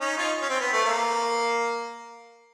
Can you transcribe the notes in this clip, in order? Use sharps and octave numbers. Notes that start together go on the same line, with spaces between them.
C#4 D#4
D#4 F4
C#4
C4
B3
A3
A#3